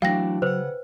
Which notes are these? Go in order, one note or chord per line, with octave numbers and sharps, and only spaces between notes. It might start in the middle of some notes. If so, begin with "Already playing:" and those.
E3 F#3 A3 D4 F5 G5 A#6
C#3 B4 C5 F#5